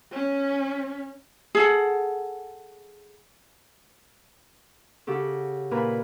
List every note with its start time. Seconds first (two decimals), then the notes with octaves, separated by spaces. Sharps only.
0.12 C#4
1.55 G#4 A4 F#5
5.07 C#3 F#4 G4 A4
5.71 A#2 E4 A#4 B4